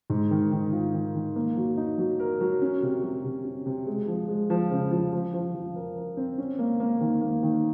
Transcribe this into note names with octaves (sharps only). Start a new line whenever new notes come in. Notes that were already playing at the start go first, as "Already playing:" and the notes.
G#2
D#3
D#3
F4
D#3
D#3
A#3
F#3
D#4
F#3
A#4
F#3
C#4
C3
F#3
C3
C#4
C3
G#3
F3
G#3
F3
C#3
F3
F3
F3
F3
A#4
A#4
C4
C#4
A#3
A#3
D#3
A#3
D#3